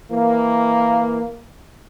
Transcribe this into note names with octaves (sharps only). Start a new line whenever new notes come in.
E3 A#3